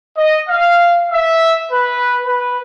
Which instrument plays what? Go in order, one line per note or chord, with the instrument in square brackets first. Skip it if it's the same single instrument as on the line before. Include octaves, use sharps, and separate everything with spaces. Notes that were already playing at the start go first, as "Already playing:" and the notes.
[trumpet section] D#5
F5
E5
B4
B4